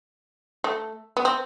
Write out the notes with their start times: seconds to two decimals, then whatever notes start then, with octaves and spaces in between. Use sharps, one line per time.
0.64 A3
1.17 B3
1.25 C4